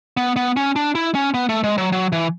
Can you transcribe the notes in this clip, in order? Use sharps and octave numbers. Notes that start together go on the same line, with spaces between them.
B3
B3
C#4
D4
E4
C#4
B3
A3
G#3
F#3
F#3
E3